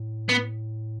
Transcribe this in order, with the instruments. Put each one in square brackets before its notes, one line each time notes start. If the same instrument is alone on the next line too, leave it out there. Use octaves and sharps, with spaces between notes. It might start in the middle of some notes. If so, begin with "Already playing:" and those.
Already playing: [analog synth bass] A2
[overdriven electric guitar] B3